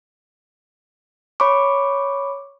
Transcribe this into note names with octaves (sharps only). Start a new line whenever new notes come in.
C#5 B5 C#6 D6